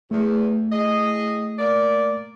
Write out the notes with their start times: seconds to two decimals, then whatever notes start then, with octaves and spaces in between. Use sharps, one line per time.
0.11 E2 A3
0.72 A2 G#4 D#5
1.58 A#3 A#4 D5